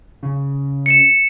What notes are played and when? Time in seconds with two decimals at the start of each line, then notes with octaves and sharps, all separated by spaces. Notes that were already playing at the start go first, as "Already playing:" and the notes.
0.23 C#3
0.86 C#7 E7